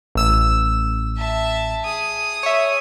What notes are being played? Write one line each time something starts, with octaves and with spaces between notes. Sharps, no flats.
A1 E6 E7
E5 A5
G#4 D#6
C#5 E5